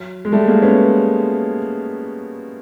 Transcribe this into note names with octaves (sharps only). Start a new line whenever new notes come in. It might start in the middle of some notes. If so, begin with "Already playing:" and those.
Already playing: F#3
G#3
G3 A3
G#3 A#3
B3 C#4